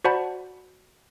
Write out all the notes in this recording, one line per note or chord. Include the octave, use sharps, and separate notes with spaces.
F#4 C5 D5 F#5 A5 B5